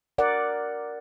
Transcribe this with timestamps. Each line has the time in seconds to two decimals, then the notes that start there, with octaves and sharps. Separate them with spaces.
0.18 A#4 D5 F#5